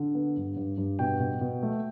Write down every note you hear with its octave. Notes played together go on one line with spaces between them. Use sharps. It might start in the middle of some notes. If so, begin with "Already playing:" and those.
Already playing: D3
B3
G2
G2
G2
B2 G5
B2
B2
A3